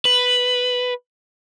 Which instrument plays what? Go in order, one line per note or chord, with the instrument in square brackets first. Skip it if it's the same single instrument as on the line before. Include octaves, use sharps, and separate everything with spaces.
[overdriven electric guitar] B4